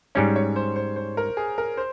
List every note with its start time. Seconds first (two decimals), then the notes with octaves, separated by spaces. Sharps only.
0.15 G#2 G3 C#4 C#5
0.36 C#5
0.56 C5
0.76 C5
0.96 C5
1.17 A#4
1.37 G#4
1.58 A#4
1.77 C5